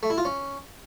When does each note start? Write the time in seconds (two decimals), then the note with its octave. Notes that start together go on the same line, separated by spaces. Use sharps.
0.03 A3
0.10 E4
0.18 F4
0.25 C#4